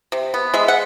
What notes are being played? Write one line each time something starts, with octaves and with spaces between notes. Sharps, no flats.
C3
B3
G#3 E5
F#5